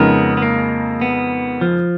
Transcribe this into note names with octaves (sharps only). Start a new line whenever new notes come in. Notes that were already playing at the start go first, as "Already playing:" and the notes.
Already playing: F2 C#3 G#3 B3 D#4 A#4
B3
A#3
B3
F3